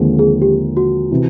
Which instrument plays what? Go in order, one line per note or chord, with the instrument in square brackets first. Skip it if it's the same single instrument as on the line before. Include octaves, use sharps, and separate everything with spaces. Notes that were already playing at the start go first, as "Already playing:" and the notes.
Already playing: [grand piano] D#2 D3 F3 G#3 C4
[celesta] G#4
G4
F#4
[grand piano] C3 E3